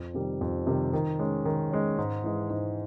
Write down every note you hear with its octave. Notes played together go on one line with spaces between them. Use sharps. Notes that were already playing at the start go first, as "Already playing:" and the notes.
Already playing: F2
C3 D#3 G3
F2
C3 D#3 G3
D#3
G#3 C#4
D#3
G#3 C#4
G#2
E3 G#3
G#2